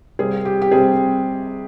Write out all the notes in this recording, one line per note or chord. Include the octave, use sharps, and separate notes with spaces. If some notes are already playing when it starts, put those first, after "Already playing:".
C3 G3 C4 G#4
G4
G4
C3 G3 C4 G#4